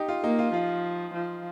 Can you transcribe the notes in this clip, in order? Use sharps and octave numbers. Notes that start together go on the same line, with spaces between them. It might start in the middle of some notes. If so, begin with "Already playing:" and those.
Already playing: D#4 G4
F4
A#3 D#4
F4
F3 F4
F3